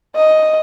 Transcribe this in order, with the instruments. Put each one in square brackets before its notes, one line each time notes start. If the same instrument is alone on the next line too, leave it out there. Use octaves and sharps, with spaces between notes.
[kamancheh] D#5